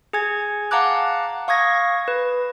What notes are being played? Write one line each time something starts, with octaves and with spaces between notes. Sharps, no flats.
G#4 G#5 G#6
F5 F#5 A5 A#5 D6 F#6
F5 C#6 D#6 G#6 A#6
B4